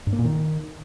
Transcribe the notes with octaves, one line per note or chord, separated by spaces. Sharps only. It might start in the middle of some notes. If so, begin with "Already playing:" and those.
G2
A#3
A#2
D#3